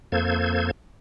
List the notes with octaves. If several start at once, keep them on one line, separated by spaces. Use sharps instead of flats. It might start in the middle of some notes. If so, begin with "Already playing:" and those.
F2 A#3 A4 C5 G#6